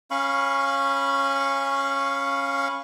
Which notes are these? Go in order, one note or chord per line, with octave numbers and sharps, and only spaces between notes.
C#4 F5 B5 C#6